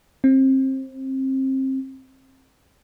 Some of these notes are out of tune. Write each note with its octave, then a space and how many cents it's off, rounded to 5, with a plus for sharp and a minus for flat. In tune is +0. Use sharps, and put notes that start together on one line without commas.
C4 +25